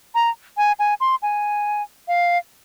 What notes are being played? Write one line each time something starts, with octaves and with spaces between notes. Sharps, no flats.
A#5
G#5
G#5
C6
G#5
F5